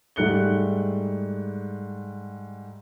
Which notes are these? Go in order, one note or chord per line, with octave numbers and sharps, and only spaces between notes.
G#2 G3 A3 F#6 C#7 G7